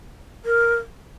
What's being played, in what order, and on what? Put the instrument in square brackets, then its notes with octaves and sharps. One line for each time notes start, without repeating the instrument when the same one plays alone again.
[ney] A#4